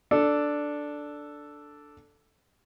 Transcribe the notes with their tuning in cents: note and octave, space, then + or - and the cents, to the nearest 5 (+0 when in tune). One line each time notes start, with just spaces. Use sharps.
D4 +0 A4 +0